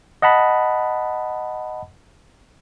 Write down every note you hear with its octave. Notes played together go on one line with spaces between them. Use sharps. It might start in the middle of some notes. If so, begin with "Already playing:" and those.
D#5 F#5 A5 B5